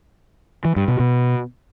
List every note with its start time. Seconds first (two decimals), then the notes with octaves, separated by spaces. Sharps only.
0.65 E3
0.76 G2
0.88 B2
1.00 B2